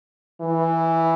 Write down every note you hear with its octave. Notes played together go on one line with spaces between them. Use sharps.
E3